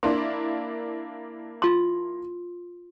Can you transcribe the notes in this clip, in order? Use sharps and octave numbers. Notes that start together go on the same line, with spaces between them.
A#3 D4 E4 C6
F4 C6